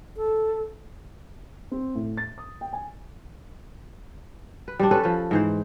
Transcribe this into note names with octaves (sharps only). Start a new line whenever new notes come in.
A4
C4
A2
A6
D#6
G5
G#5
B4
G3 C4 D4
C#4 A4 B4
F3 B4
G#2 E3 C5